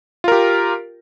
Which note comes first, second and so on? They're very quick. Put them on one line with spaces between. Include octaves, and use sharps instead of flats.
F4 A#4 G4